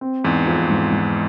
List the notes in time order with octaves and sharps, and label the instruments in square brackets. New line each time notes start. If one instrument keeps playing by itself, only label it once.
[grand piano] C4
[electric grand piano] E2 G#2 [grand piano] C4
[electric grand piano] F2 [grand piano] F4
[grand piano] G#2
G#2